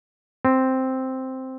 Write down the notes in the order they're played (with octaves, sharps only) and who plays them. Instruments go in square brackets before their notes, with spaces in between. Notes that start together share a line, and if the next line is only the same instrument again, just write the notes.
[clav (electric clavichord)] C4